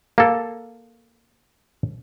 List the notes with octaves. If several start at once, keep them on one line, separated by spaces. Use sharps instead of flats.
A#3 A4